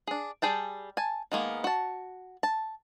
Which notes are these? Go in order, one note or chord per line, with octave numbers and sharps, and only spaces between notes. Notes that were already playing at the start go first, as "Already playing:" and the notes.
D4 G#4
G3 G#4 G5 A5
G#5 A5
D#3 G#3 A#3 B3
F#4 A5
A5